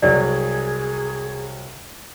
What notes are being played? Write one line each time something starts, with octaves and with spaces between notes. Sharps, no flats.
C2 F#3 G#4 D5